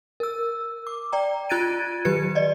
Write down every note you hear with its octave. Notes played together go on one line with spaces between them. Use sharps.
A#4 E6
D6
D5 G5 A#5
F4 F#6 G#6 A6 D7 D#7
D#3 F#3 G4 B4 G#6 C#7
D5 D#5